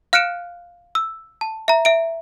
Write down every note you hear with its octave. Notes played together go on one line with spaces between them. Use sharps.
F5 F6 F#6 C#7 D7 E7
E6
A5
E5 A#5
E5 D7